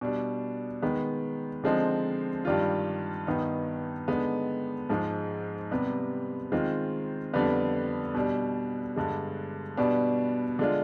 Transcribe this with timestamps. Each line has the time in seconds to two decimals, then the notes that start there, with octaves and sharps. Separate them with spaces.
0.01 B2 G3 D4
0.82 D#3 G#3 B3
1.64 D3 F3 G#3 C4 D#4
2.45 G2 D#3 G3 D4 F4
3.27 G2 D#3 B3 D#4
4.08 D3 G#3 B3 D#4
4.89 G#2 F3 G#3
5.71 C3 G3 B3
6.52 D#3 G#3 C4 F4
7.34 F2 D3 G3 B3
8.14 B2 G3 D4
8.96 G2 D3 G#3
9.77 B2 G3 B3 D4
10.59 D3 G#3 D4 F4